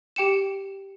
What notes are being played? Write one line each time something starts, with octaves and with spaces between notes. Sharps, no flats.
G4 G5 C#7 E7